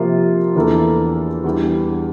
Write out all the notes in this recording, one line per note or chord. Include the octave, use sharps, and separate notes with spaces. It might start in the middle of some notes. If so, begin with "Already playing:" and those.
Already playing: C3 F3 A#3 F4 A#4
E2 E3 A#3 D4 A4
E2 E3 G3 D4 G4